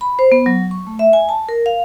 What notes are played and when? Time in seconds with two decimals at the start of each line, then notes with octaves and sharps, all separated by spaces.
0.01 B5
0.19 C5
0.32 B3
0.46 F#3
0.71 C#6
0.87 A3
0.99 E5
1.13 G#5
1.29 A5
1.49 A#4
1.66 F5